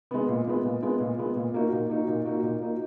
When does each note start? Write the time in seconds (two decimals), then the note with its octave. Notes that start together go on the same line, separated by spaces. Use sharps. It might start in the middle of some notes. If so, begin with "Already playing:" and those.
0.11 G#3 B3
0.28 A#2
0.47 G#3 B3
0.65 A#2
0.83 G#3 B3
1.00 A#2
1.19 G#3 B3
1.36 A#2
1.54 A#3 D#4 F#4
1.72 A#2
1.89 A#3 D#4 F#4
2.08 A#2
2.26 A#3 D#4 F#4
2.43 A#2
2.62 A#3 D#4 F#4